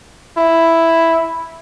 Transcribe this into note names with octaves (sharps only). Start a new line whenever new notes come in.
E4